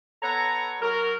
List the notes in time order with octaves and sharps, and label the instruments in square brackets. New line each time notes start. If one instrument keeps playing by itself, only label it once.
[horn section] B3 A4 C#5 A#5
F#3 A#4